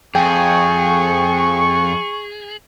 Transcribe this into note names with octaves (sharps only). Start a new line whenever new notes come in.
F2 G#4 G5 C#6